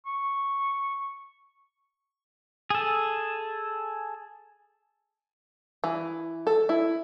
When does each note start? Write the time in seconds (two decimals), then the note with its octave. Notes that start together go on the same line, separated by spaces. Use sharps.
0.06 C#6
2.70 G#4 A4
5.84 E3
6.47 A4
6.69 E4